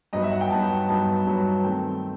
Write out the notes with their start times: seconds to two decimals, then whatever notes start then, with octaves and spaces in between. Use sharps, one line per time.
0.13 G2 F#3 B3 D#4 D#5
0.22 E5
0.31 F#5
0.41 G5
0.50 G2 F#3 B3 D#4 A5
0.89 G2 F#3 B3 D#4 A5
1.26 G2 F#3 B3 D#4
1.64 D#3 A3 C4 G5